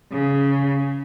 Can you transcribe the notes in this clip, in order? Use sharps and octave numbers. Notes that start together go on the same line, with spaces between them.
C#3